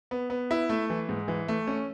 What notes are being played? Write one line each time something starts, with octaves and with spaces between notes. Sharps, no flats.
B3
B3
E4
A3
E3
G#2
E3
A3
C#4